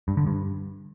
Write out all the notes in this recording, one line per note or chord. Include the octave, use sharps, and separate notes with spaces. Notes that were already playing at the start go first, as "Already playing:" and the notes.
G2
D3
G2